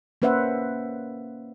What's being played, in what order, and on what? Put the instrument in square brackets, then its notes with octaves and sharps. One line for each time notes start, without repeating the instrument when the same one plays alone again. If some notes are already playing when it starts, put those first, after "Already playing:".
[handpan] A#3 C#4 B4 C5 E5 F#5